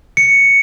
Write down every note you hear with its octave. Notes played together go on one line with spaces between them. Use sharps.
C#7